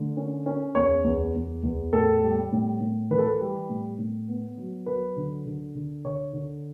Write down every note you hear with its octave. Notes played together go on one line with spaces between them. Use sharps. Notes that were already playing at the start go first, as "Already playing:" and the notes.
Already playing: D3 A3
C#4
C#4
E2 C#5
E2
E2
E2
A2 A4
G3
A2
A2
E3 B4
A4
B4
G3
A2
A2
B3
F#3
F#3 B4
D3
D3
D3
D3 C#5
D3